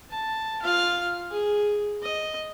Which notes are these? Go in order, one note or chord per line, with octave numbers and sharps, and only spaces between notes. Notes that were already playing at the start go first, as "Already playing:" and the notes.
A5
F4 F5
G#4
D#5